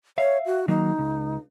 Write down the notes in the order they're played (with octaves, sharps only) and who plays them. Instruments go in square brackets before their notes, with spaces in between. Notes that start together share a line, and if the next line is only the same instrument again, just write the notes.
[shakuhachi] C#5 [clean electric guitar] E5 F5
[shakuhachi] F#4
[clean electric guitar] D#3 F#3 A#3 [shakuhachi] D#4
[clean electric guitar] C#2